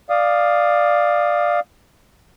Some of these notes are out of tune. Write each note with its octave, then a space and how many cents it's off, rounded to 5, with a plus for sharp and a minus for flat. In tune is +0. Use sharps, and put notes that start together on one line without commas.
D5 +10 F5 +0 D#6 -10